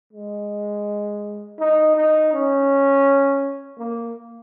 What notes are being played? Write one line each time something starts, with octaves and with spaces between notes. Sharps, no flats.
G#3
D#4
D#4
C#4
A#3